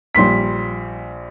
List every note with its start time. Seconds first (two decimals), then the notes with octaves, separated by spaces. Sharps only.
0.15 A#1 G3 C6 B6